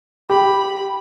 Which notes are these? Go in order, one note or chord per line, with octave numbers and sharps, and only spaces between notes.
G4 B5